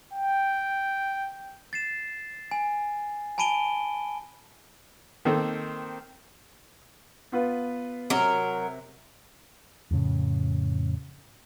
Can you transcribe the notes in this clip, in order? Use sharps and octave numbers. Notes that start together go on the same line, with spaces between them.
G5
A6 C7 E7
G#5
G#5 A5 B5 D7 D#7 G7
D#3 A#3 C4 A4
B3 F4 B4
C3 F#3 A#4
F2 A2 C#3